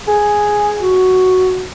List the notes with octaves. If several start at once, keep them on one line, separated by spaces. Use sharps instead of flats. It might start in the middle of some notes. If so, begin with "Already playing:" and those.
G#4
F#4